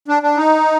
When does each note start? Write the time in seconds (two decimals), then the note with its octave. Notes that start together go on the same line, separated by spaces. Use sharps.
0.08 D4
0.23 D4
0.37 D#4